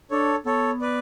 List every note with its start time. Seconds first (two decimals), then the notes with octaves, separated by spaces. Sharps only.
0.11 D4 A4 C#5
0.46 B3 A4 C#5
0.81 B4 D5